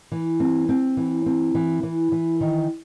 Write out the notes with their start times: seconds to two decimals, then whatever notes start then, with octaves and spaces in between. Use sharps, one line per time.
0.12 E3
0.40 C4
0.69 C4
0.97 E3
1.26 C4
1.55 E3
1.83 E3
2.12 E3
2.41 D#3